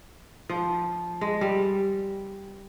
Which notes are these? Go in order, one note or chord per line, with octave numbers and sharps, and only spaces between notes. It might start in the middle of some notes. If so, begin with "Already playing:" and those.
F3
G#3
G3